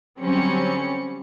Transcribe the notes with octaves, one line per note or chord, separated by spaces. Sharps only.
D3 F#3 G3 C4 C#4 C#7